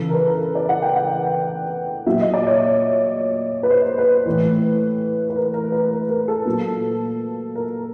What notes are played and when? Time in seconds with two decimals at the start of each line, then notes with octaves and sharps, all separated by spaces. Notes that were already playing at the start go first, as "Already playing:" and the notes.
Already playing: C#3 E3 A4
0.09 A#4
0.14 B4
0.27 A#4
0.41 A#4
0.55 D5
0.69 F#5
0.82 G5
0.96 F#5
2.06 A#2 F#3 E5
2.20 D#5
2.34 D5
2.47 C#5
3.63 B4
3.70 C5
3.98 B4
4.26 A2 E3
5.30 B4
5.36 A#4
5.54 A#4
5.72 B4
5.91 A#4
6.09 A#4
6.28 A4
6.45 A#2 F#3
7.55 A#4